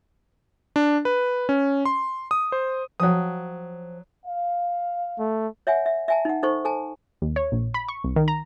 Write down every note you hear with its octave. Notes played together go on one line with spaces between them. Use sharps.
D4
B4
C#4
C6
D#6
C5
F3 F#3 C5 G5 D#6
F5
A3
C#5 E5 F#5 G#5
E5
E5 G#5 A5
D#4 F#5
D#4 A4 C5 C#6
A4 G#5 A5
D#2
C#5
A#1
B5
C#6
C2
D#3
A#5